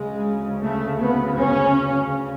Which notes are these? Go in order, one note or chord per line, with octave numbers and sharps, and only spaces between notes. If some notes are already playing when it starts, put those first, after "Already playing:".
Already playing: D2 C#3 G#3
A3
B3
C#4